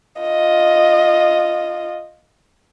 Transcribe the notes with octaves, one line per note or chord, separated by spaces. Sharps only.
F4 D#5